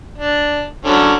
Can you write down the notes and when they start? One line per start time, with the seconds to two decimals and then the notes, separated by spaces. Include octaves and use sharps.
0.18 D4
0.85 D3 F#3 C#4